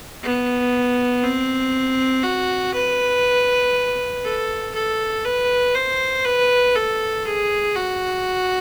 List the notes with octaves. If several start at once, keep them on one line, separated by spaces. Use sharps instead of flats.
B3
C4
F#4
B4
A4
A4
B4
C5
B4
A4
G#4
F#4